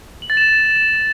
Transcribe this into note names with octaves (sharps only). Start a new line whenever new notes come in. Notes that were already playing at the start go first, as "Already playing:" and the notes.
F#7
A6
E7